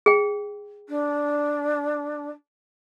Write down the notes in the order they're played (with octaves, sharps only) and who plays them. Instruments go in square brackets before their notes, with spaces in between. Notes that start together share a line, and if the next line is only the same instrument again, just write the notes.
[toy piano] G#4 G5
[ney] D4